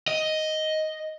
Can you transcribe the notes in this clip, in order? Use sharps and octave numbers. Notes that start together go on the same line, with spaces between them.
D#5